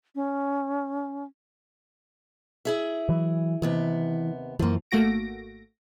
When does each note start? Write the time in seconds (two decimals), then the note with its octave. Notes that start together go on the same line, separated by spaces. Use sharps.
0.15 C#4
2.65 E4 G#4 E5
3.09 E3 F#3
3.62 D#2 C3 E3 B3
4.59 F#2 E3 F3 A#3
4.91 G#1 A3 A#3 F#4 A#6 D7